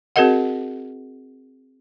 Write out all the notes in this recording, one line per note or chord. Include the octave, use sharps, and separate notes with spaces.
C4 F#4 G#4 A#4 D#5 F#5